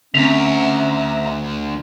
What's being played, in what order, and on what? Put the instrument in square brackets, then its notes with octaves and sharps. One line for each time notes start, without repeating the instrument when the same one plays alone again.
[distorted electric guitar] D2 [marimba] C4 [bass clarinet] C#4 [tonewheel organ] E5 A#5